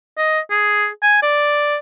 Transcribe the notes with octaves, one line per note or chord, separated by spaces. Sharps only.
D#5
G#4
G#5
D5